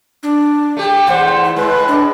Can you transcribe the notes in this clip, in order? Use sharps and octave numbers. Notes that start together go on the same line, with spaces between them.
D4
A3 G4
E2 A3 C5 F#5
E4
A2 G#3 B4
D4